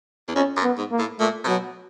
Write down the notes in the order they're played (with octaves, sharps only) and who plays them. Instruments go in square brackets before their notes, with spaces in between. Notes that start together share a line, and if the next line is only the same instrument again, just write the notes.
[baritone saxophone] E2
[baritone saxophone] F2 [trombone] C#4
[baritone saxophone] F#2
[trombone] B3
[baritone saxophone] G#2
[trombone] A#3
[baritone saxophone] A2
[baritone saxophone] A#2 [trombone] A3
[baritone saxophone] C3
[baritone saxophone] B2 [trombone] F#3